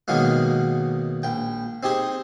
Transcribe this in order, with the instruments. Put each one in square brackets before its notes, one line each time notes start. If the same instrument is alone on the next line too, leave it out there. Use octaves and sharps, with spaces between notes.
[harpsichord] B2 D#3 F#3 G#3 A#3
A#1 G5
C4 D#4 G4 G#4